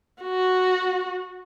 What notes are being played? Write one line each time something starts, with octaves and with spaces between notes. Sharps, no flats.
F#4